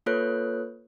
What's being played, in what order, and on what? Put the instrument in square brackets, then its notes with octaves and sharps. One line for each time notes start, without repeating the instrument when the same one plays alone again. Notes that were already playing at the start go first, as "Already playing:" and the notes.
[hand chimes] A#3 F4 A4 B4 C#5 F#6